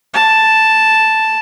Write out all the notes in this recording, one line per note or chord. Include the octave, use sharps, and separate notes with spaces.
A5